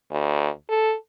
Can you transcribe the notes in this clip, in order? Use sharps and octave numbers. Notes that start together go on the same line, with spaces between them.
D2
A4